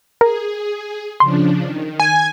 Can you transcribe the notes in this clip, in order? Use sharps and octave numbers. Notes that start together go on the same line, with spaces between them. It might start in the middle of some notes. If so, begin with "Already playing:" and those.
G#4 A#4
C#3 F3 D4 C6
D#3
G#5